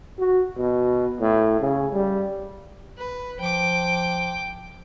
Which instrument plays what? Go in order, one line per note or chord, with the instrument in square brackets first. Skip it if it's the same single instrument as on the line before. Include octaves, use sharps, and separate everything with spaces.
[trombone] F#4
B2
A2
C#3
G3
[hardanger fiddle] B4
[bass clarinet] F3 [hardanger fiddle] G5 D6